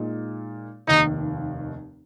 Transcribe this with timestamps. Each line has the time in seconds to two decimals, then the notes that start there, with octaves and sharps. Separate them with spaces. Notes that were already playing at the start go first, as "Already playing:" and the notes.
Already playing: A#2 G#3 D#4
0.87 F1 D#2 D#3 D#4